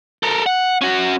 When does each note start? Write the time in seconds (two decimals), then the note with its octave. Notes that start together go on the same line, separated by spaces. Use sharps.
0.23 A4 A#4
0.46 F#5
0.81 C#4 F#4